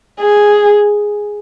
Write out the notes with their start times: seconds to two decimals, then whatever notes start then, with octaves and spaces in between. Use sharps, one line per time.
0.20 G#4